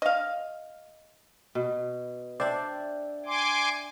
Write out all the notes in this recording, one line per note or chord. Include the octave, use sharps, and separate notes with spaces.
D#5 F5
B2
D4 C5 D5 E5 G5
G#5 C6 D6